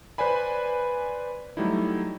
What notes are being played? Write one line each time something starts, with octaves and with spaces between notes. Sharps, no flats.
B4 C5 D5 G#5 B5
F#3 G3 A3 D#4 E4